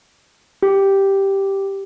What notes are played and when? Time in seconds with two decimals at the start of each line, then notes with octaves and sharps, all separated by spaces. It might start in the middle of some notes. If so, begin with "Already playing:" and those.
0.63 G4